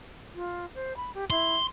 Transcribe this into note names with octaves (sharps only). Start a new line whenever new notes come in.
F4
C5
B5
G4
E4 C6